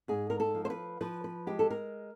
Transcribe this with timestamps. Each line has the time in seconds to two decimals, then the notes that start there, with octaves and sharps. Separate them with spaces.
0.08 G#2 G#4
0.30 A#4
0.40 A4
0.55 F3
0.65 C5
0.70 B4
1.01 F3 B4
1.24 B4
1.47 G#3 G4
1.59 A4
1.70 A#4